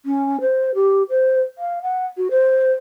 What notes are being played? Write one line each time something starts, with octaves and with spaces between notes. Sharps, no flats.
C#4
C5
G4
C5
F5
F#5
F#4
C5